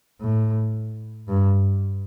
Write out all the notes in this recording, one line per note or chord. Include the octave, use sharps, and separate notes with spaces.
A2
G2